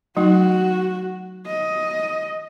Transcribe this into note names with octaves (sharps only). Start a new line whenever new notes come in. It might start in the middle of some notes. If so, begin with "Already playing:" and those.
F#3 A3 D#4 F#4
D#5